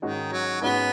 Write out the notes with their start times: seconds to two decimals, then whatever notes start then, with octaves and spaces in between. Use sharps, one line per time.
0.02 G#2 D#3 G#3 C#4 F#4
0.32 F#3
0.61 G#2 G#3 B3 C#4 F#4